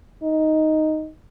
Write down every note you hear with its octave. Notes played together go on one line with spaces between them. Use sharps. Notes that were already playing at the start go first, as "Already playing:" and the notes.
D#4